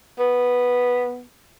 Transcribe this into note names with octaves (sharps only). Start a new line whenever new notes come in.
B3